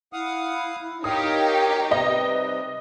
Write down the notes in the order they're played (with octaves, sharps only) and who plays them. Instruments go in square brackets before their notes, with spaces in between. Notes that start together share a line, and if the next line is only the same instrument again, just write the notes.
[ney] E4 [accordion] F5 F#5 D#6
[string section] D#4 G4 [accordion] A#4 C#5 F5 [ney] G5 [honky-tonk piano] D#6
[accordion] C3 G3 [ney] B4 [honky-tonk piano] D#5